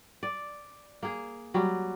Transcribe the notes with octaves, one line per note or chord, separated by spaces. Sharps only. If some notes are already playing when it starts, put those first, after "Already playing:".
D5
A#3 G#4
F#3 G3